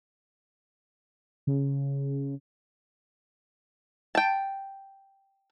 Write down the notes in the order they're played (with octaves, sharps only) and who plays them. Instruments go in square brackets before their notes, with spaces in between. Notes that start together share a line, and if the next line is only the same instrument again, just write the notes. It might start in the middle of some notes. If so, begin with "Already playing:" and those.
[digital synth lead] C#3
[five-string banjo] G5 A5